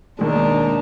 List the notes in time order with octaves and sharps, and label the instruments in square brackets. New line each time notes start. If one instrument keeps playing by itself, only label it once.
[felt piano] D#2 G#3 [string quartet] B2 D4 D#4